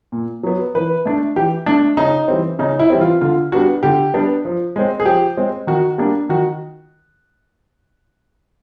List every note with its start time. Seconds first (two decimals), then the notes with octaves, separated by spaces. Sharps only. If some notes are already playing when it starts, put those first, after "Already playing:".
0.12 A#2
0.43 F#3 B3
0.75 E3 B4
1.06 A3 D4
1.36 E3 G4
1.66 A3 D4
1.97 C#3 D#4
2.28 E3 G3 C4
2.59 C#3 D#4
2.79 E4
2.90 E3 G3 C4
3.01 F4
3.21 D3 F4
3.52 G3 B3 D4 F#4
3.83 D3 G4
4.14 G3 B3 D4
4.45 F3
4.76 G#3 C4
5.00 G#4
5.05 F3 G4
5.37 G#3 C4
5.67 D#3 F#4
5.98 G3 A#3 D4
6.29 D#3 F#4